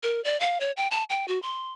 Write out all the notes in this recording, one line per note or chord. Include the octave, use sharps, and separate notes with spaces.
A#4
D5
F5
C#5
G5
A5
G5
F#4
C6